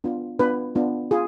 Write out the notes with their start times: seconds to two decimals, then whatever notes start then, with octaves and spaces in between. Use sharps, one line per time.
0.04 B3 D4 F4
0.39 B3 D4 F4 B4
0.75 B3 D4 F4
1.11 F4 G#4